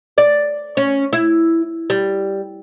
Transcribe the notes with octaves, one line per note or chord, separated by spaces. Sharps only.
D5
C#4
E4
G3